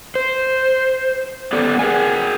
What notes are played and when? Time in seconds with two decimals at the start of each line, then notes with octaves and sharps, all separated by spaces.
0.15 C5
1.53 B3 G4 A4 D5
1.79 G#4 A#4 F#5 G#5